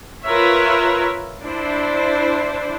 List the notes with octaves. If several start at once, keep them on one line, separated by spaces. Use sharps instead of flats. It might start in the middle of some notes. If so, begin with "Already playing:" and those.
F4 A#4 B4 C#5 E5
D4 E4 C5